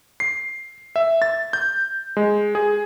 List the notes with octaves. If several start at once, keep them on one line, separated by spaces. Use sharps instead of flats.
C7
E5
A6
G6
G#3
G#4